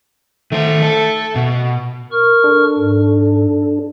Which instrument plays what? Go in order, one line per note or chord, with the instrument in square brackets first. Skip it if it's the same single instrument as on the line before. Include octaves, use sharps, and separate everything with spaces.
[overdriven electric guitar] D#3 C5 [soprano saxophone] A3
[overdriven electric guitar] A4
B2
[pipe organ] A#4 C#6 F6
[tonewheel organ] D4 A4
[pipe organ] G#2